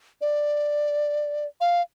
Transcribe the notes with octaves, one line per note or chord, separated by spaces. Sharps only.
D5
F5